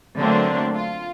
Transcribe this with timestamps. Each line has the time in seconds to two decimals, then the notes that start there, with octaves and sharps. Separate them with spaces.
0.19 D3 F#3 A3 A#3 C4 D4
0.75 F4